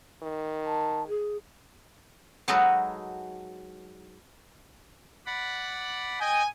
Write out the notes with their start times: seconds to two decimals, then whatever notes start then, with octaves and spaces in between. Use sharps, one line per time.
0.23 D#3
0.65 A5
1.08 G#4
2.48 F#3 G#3 D#4 F#4 A4 B4
5.26 D5 F#5 B5
6.20 D#5 G5 G#5